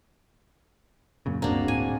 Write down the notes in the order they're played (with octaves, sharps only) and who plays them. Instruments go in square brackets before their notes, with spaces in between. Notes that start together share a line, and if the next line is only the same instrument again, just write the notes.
[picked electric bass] F#2 A#2 C#3
[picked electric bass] D1 [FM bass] G2 [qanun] A#3 D4 [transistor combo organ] C4 F#4 G#4
[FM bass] A2 [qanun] G#5